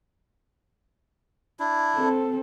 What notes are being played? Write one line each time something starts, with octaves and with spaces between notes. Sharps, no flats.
D4 E4
C4 A4